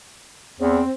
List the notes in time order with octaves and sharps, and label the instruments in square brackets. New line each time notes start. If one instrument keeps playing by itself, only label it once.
[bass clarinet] E2 [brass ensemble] C4